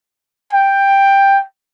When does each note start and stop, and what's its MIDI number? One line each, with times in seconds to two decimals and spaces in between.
0.52 1.42 79